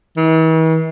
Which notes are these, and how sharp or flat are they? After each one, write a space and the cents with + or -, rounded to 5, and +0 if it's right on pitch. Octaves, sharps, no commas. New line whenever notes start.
E3 -45